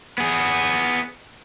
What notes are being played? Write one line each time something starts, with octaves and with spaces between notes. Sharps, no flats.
B3 G#4